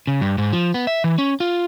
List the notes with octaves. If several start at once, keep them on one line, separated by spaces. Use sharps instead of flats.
C#3
G2
G#2
F3
B3
E5
E3
C#4
F4